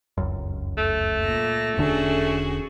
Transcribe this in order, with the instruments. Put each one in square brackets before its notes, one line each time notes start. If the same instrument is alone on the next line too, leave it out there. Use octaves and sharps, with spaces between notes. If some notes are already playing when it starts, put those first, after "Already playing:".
[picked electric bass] F1 C#2 F#2
[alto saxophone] A3
[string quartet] A#2 A#6
[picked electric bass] E1 D3 D4 [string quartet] C#4 F#4 G#4